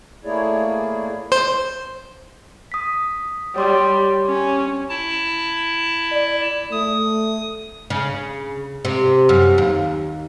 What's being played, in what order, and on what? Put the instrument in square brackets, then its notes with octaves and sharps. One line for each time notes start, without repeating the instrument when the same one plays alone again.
[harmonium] A3 A#3 E4 G#4 C#5 D5
[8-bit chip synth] C5
[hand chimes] D#6 B6
[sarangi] G3 [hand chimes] C#5 C6 D6
[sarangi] C#4
[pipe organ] E4 A5
[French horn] D5
[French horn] A3 [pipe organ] D#6
[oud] C#3
C3
F#2
D#2